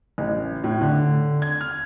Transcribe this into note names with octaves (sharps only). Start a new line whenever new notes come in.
A1
A2
D3
G#6
F6